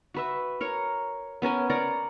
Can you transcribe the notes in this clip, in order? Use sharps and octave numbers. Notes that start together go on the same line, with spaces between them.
F#4 B4 E5
A#4 C#5
B3 C#4 A#4 G#5
A#4 C#5 D5 A#5